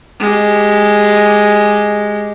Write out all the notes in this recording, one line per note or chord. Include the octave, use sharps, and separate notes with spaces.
G#3 G4